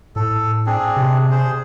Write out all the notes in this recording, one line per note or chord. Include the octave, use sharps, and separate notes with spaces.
A2 A4
C4 D4 G#4
C3
G#4 C5